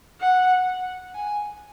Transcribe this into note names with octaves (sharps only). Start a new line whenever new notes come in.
F#5
G#5